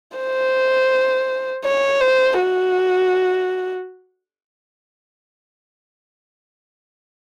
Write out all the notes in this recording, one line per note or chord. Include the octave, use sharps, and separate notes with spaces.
C5
C#5
C5
F#4